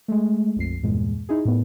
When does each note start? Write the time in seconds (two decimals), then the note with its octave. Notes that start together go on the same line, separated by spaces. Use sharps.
0.08 G#3 A3
0.56 A#1 F2 C7
0.83 E2 G2 A#2 G#3
1.29 D#4 E4 G#4
1.45 A2 B3